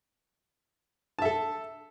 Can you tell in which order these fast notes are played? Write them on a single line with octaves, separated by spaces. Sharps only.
A5 E5 A4